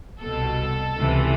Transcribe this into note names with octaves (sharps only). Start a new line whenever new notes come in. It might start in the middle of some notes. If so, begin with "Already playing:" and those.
C2 B2 A4
C#2 C3 E3